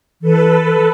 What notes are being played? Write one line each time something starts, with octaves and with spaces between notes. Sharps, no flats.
E3 A4 B4